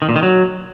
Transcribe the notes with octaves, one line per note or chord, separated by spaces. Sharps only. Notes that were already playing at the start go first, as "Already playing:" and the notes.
D#3
A#2
D#3
F#3